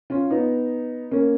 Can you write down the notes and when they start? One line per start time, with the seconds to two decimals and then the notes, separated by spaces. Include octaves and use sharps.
0.10 C#4 F4
0.30 B3 D#4
1.11 A#3 C#4